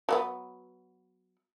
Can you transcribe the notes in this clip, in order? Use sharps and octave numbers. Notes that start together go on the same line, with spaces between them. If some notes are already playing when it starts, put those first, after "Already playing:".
F#3 A#3 B3